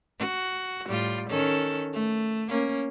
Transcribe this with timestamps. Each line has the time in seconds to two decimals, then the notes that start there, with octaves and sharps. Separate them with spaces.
0.19 F#4
0.87 A2 G3 F4
1.29 D#3 C#4 A4
1.93 A3
2.49 A#3 C#4